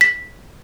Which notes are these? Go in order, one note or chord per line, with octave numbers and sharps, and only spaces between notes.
B6